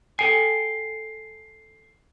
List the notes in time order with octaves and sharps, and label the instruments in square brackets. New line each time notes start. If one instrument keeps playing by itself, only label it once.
[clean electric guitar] A4 G5 G#5 [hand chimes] C7